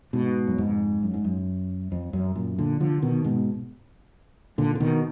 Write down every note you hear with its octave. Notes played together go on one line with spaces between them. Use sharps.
G#2 B2
F#2
F2 G#2
F#2
G#2
F#2
F2
F#2
F#2 A#2
A#2 D3
D3 F3
B2 D#3
G#2 B2
A#2 D3
D3
B2 D#3